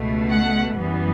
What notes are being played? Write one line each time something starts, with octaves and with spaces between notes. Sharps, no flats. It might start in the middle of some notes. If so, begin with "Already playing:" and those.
Already playing: C#2 B2 A3
F#5
F#2 E3 G3 B3